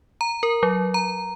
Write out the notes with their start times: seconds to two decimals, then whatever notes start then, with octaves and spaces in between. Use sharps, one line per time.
0.21 A#5
0.43 A#4
0.63 F#3
0.94 A#5